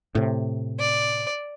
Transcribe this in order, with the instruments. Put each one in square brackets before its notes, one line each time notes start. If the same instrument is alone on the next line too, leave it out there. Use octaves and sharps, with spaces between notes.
[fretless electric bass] A2 C3
[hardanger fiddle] D5